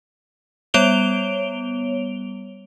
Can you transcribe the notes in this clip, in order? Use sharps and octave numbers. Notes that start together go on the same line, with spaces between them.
G3 B3 C#5 D7 F7 G7